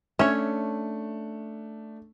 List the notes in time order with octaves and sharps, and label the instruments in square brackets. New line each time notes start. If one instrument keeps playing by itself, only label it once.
[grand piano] A3 D4 [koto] C#4 [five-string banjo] C#5 E5